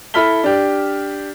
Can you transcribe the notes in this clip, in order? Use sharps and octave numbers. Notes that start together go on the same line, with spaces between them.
E4 A4 B5 F6 B6 G7
D4 G4